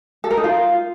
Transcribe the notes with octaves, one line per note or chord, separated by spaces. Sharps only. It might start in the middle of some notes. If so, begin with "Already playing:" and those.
A4
A#4
D#4
F4